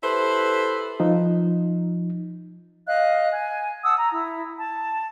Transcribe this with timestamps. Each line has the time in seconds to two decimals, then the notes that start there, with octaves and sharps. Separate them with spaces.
0.02 E4 G4 A4 B4 C5
1.00 F3 D#4
2.87 D#5 F5 F#6
3.32 G#5
3.84 F#5 A5 D#6 E6
3.96 A#5
4.12 E4
4.59 A5